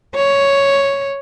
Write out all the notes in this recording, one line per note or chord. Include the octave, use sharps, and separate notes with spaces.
C#5